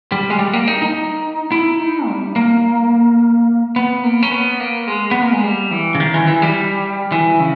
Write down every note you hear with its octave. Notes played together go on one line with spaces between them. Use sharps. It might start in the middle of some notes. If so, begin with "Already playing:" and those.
G3
G#3
G3
A#3
D#4
D#4
E4
D#4
G3
A#3
B3
A#3
C#4
B3
A#3
G#3
B3
A#3
G#3
G3
E3
C#3
D#3
E3
E3
G3
E3
C#3